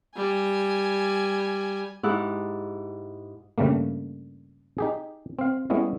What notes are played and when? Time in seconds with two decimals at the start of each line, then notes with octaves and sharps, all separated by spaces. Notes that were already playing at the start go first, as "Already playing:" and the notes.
0.16 G3 G#5
2.03 G#2 E4 G4 F#6
3.58 G2 C#3 G3 A3 A#3
4.78 D#4 G4 G#4
5.39 C4 F5
5.70 G3 G#3 B3 C#4 E4